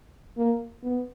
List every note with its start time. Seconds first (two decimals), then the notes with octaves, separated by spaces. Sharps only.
0.37 A#3
0.83 B3